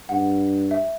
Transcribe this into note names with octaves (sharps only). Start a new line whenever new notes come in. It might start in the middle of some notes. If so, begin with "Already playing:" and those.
G2 F#5
E5